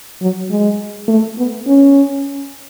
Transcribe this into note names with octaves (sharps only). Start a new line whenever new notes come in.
F#3
G#3
A3
B3
C#4